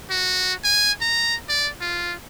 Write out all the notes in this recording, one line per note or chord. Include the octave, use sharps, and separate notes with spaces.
F#4
G#5
A#5
D5
F4